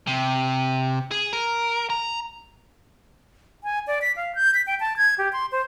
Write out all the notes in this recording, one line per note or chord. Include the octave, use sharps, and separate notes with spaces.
C3
G#4
A#4
A#5
G#5
D5
B6
F5
G6
B6
G5
A5
G#6
G4
C6
C5